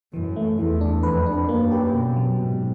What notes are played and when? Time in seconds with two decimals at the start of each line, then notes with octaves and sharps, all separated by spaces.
0.13 F#2 E3
0.36 A3
0.58 E2 E3
0.81 D4
1.03 F2 B4
1.26 D4
1.49 F#2 A#3
1.72 G4
1.94 B2
2.17 F#3
2.39 G#2 B2